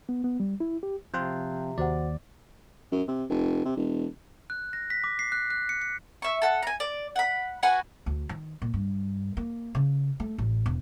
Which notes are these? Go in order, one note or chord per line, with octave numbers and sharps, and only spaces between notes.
B3
B3
G3
E4
G4
C3 F3 C4 F4 C6 F#6 G6
D#2 F#4 C5 D5 F#5
F#2
C3
F1
C3
E1
F#6
A#6
B6
D6
C7
F#6
F#6
C#7
C#7
E5 C#6
A4 F#5
G#5 A#5
D5
F#5 B5
F#4 B4 F#5 G#5
D2
D#3
A#2
G2
A#3
C#3
A3
A1
E1